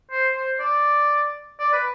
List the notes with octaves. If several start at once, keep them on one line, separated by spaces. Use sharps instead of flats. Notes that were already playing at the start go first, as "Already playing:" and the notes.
C5
C5
D5
D5
B4